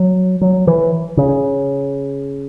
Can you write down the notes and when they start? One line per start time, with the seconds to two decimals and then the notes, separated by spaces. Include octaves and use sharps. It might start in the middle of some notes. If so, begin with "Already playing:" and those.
Already playing: F#3
0.41 F#3
0.67 E3
1.17 C#3